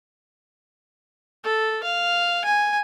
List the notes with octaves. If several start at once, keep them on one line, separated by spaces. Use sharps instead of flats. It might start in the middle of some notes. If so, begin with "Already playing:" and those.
A4
F5
G#5